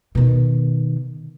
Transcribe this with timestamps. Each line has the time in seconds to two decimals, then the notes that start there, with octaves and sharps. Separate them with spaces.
0.15 B2 D#3